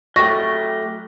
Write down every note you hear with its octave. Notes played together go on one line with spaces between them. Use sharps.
F#3 A3 G4 C#6 A#6